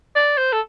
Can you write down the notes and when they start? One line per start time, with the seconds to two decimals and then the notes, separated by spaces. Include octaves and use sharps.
0.16 D5
0.37 C5
0.53 A4